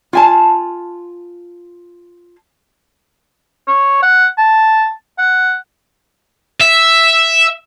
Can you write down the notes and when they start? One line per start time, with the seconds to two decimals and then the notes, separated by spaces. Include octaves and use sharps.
0.13 F4 G#5 A5
3.68 C#5
4.03 F#5
4.38 A5
5.18 F#5
6.60 E5